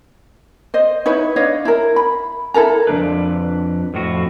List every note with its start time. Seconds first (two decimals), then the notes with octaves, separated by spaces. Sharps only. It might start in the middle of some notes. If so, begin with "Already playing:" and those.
0.74 C5 D#5
1.06 D#4 E4 B4 C#5
1.36 D4 C#5 D#5 F5
1.65 E4 A#4
1.96 B5
2.54 E4 A4 A#4 A#5
2.87 F2 G#3 D4 B4
3.94 F2 A2 F#4